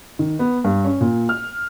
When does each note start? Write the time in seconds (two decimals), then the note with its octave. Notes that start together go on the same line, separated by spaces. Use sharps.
0.19 D#3
0.39 B3
0.64 G2
0.85 C#4
1.01 A#2
1.29 F6